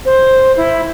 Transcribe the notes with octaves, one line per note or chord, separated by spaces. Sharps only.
C5
E4